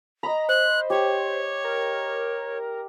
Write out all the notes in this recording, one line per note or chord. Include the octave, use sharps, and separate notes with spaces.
D#5 A#5 B5
C5 F#6
G4 C#5
A#4